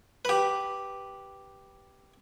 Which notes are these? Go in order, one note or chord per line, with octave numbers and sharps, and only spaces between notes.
G4 B4